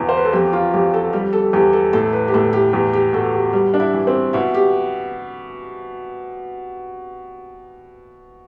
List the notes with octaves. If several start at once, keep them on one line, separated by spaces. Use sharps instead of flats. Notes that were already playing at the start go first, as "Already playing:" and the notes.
Already playing: E2 B2
C5
B4
A4
F2 G4
F4
F2 G4
A4
G3 G4
A4
E2 G4
A4
A2 A4
B4
G4
A2 A4
G4
E2 G4
G4
B2 A4
G4
G3
D4
E4
E3
C4
B2 E4
G4